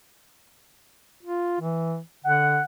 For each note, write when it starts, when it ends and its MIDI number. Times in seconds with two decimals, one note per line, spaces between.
1.23 1.59 65
1.60 2.00 52
2.24 2.60 50
2.24 2.64 78